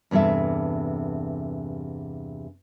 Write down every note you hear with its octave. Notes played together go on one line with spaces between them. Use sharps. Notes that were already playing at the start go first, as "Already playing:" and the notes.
E2 G2 C3 A4 E5